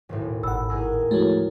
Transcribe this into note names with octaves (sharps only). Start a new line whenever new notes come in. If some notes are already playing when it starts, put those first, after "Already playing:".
D#1 B1 A2
G#1 F#5 B5 E6
A2 G#4 A#4 E6
F3 G#3 A3 E4 F#4 C#5